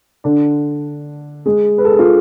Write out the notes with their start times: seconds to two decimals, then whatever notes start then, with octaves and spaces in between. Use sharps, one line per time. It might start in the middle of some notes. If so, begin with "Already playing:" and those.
0.24 D3 D4
1.46 G#3 G#4
1.78 B4
1.85 A4
1.92 G#4
1.99 F4